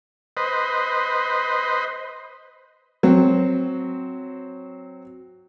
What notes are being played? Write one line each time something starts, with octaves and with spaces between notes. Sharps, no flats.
B4 C5 D#5
F#3 C4